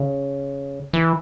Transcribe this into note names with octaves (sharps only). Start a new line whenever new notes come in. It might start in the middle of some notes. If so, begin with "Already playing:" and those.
Already playing: C#3
E3